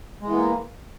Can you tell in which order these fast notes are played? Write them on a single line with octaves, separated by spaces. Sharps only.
G#3 E3 B3 A#3